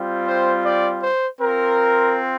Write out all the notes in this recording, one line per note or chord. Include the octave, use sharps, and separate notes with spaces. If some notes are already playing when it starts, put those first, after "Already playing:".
Already playing: G3 C4 F4
C5
D5
C5
C4 F4 A#4